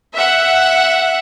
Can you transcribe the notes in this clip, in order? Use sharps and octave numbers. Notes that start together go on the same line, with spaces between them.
E5 F#5